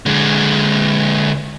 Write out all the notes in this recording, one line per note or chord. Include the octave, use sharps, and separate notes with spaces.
D3 G#3